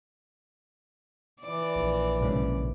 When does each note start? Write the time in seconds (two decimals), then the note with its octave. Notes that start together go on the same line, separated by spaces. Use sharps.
1.41 E3 D5
1.76 A#1
2.20 B1 G#2 C#3